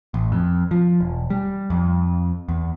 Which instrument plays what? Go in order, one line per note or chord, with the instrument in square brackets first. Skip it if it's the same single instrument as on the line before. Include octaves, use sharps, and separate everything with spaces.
[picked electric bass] A1
F2
F3
E1
G3
F2
E2